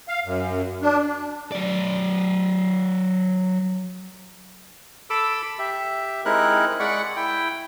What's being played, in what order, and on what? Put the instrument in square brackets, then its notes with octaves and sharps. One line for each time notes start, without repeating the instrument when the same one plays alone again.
[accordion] F5
F#2
D4
[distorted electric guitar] F#3 D5
[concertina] A4 B5 D6 E6
G4 E5
G#3 C4 D#4 E4 A#4 F#6
G#3 D5 F#5 B5 C#6
E4 G5